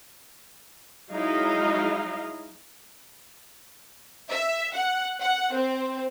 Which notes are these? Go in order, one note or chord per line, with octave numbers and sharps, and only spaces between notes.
F#3 G#3 D#4 E4 D#5 F5
E5
F#5
F#5
C4